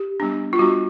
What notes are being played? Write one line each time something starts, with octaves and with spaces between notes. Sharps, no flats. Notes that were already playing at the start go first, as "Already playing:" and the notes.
Already playing: G4
G3 B3 D4
F4
G3 B3 D4 F#4